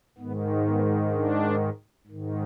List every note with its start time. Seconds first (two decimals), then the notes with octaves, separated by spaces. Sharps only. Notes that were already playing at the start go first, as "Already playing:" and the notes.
0.18 G#2 D#3 B3
0.67 B3
1.13 D4
2.07 G#2 D#3